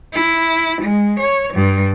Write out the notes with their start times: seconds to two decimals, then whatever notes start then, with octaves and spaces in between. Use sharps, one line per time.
0.13 E4
0.82 G#3
1.20 C#5
1.54 G2